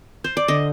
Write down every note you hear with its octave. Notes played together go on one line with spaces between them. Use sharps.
C5
D5
D3 D#5